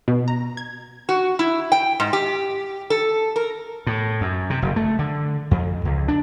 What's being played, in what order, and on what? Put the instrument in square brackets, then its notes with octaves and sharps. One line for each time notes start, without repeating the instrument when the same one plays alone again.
[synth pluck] B2
A#5
G#6
[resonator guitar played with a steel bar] F#4
E4
G5
G#2
G4
A4
A#4
[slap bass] A2
F#2
C3
F#1
A3
D3
F2
C#2
D4